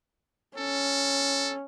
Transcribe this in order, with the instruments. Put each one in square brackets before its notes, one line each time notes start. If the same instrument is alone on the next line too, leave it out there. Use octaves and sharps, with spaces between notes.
[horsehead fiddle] C#4 [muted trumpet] A4